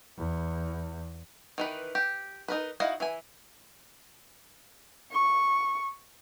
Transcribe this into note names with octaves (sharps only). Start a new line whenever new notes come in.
E2
D#3 E3 B4
G4
D#4 A#4 B4
D#4 E4 F#4 D#5 F5
E3 E5 G#5
C#6